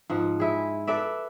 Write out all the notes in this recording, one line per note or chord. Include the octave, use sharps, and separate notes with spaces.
G#2 F3 F#5
E4 G#4
A4 B4 D5 E5